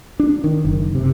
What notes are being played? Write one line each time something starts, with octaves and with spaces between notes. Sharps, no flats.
D4
D#3
F#1
C3